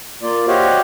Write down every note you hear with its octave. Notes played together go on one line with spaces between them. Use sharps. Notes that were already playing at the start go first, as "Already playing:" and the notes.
A#3 F4 D5
F#4 G4 C5 C#5 D#5 F5